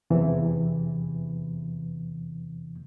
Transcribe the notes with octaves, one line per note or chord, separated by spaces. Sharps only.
E2 C3 E3